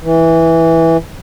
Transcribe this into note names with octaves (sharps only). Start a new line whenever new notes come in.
E3